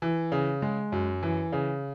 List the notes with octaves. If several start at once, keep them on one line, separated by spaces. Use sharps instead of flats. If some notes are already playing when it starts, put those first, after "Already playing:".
E3
C#3
G#3
F#2
E3
C#3